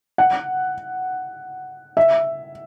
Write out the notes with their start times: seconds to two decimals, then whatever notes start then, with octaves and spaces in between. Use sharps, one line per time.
0.18 F#5
1.97 E5